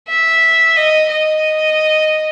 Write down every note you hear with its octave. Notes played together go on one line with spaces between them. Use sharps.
E5
D#5
D#5